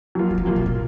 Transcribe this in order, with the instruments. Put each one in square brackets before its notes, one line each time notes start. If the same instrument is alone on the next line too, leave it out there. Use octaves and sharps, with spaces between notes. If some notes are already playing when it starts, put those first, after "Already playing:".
[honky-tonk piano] F#3 A#3 F4
[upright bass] F#3
F3
[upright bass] D#3 [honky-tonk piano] F#3 A#3 F4
[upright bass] B2
A#2